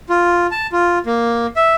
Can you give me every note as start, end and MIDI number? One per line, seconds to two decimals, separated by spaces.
0.09 0.47 65
0.51 0.67 81
0.72 0.99 65
1.06 1.47 58
1.56 1.75 76